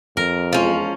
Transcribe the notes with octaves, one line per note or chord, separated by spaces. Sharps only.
F2 A#4
E2 F3 G#3 C#4 F4